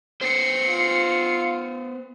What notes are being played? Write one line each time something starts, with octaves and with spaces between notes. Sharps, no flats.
B3 C5 C7 C#7
F4